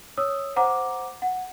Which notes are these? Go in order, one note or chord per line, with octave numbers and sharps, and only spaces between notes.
C#5 D#6 E6
C5 F#5 A#5 D6
F#5